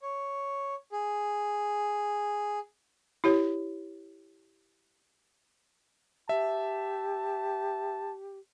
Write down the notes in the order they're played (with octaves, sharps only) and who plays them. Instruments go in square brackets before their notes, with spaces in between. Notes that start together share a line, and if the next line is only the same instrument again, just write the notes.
[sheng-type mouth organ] C#5
G#4
[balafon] E4 G4 C#5
[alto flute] G4 [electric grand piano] E5 [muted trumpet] A5